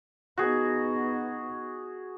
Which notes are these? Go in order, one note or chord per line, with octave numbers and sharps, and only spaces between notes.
B3 D#4 F#4 G#4